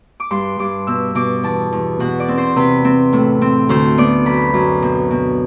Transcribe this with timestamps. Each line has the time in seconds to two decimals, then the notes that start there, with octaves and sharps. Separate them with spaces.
0.20 D6
0.31 G2 C6
0.59 G2 D6
0.87 B2 E6
1.15 B2 D6
1.43 E2 A5
1.72 E2
2.00 B2 F#5
2.20 D5
2.28 C4
2.38 C5
2.56 C3 B4
2.85 C4
3.13 A2
3.41 C4
3.69 D2 C5
3.98 B3 D5
4.26 F#2 B5
4.54 F#2
4.82 B2
5.10 B2